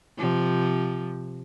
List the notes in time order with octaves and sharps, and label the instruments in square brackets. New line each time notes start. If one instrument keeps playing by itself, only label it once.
[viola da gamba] C3 F3